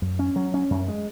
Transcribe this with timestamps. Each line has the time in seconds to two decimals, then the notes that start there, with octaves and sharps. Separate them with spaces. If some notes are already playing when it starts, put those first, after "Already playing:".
0.02 F#2
0.19 C#4
0.36 F#3
0.54 C#4
0.70 F#2
0.88 G#3